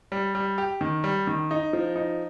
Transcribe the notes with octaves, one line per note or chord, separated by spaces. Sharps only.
G3
G3
G4
D#3
G3
D#3
D#4
F3
D#4